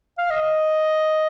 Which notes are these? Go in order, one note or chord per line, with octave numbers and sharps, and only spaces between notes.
F5
D#5